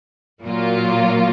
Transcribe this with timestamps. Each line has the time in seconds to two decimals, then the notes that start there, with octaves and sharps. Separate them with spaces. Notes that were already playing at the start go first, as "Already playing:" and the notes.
0.43 A#2 F#3 A#3 F4